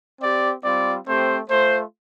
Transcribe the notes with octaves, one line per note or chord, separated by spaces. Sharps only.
C4 G4 D5
G3 C4 F4 D5
A3 C4 G4 C5
A3 F4 C5